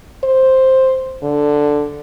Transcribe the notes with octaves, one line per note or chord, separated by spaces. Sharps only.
C5
D3